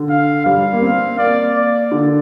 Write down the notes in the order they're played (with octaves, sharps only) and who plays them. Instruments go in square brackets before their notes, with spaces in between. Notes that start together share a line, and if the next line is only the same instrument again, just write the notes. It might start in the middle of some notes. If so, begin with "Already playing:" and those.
Already playing: [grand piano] D3
[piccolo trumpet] F5
[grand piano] G3 [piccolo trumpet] F5
[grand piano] A#3
C4
[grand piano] A#3 [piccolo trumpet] D5
[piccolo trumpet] D5
[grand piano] D3